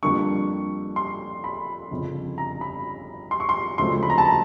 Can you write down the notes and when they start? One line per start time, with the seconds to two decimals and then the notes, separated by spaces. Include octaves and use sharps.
0.03 F2 D3 G3 A#3 D4 C#6
0.96 C6
1.44 B5
1.91 G1 F2 C#3
2.38 A#5
2.61 B5
3.31 C6
3.40 C#6
3.49 C6
3.78 D2 C#3 F3 G#3 C4 C6
4.03 B5
4.10 A#5
4.18 A5
4.25 A#5